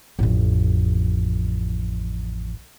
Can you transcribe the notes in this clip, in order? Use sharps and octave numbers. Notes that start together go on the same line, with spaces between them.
A1 F2